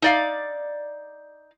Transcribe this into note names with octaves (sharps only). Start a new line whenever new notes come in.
D#4 D5 F5